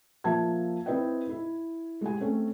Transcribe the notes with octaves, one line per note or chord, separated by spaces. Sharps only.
F3 A#3 E5 A5 G#6
C4 E4 B4 D#5 E5 G5
E4
G#3 G4 G#5
A3 C4 C#4